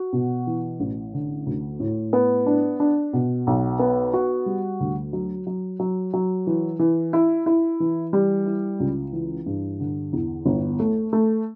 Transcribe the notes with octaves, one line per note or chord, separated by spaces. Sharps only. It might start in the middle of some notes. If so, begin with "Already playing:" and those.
Already playing: F#4
B2
E3
A1
D3
D2
A2
B3
D4
D4
B2
B1
B3
F#4
G3
D2
F#3
F#3
F#3
F#3
E3
E3
E4
E4
E3
G3
E4
C#2
E3
G2
D3
E2
G1
A3
A3